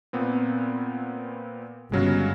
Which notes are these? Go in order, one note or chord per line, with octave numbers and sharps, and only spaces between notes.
A#2 B3 C4
G1 C#3 F#3 G#3